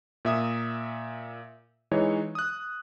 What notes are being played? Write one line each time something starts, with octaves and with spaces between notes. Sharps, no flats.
A#2 E5 D#6
E3 G#3 D#4 C#5
D#6 F#6